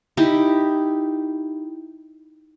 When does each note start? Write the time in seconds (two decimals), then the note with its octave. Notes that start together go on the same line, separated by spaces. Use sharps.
0.17 D#4 E4 G4